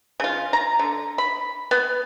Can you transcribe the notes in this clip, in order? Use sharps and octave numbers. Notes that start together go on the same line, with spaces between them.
C#3 F4
A#5
D3
B5
B3